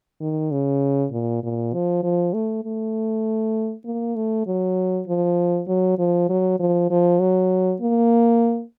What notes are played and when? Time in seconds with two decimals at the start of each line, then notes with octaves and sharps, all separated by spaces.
0.21 D#3
0.51 C#3
1.12 A#2
1.43 A#2
1.74 F3
2.03 F3
2.34 A3
2.64 A3
3.85 A#3
4.16 A3
4.47 F#3
5.08 F3
5.67 F#3
5.98 F3
6.29 F#3
6.60 F3
6.90 F3
7.20 F#3
7.81 A#3